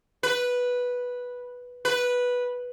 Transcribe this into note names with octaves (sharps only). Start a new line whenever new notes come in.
B4
B4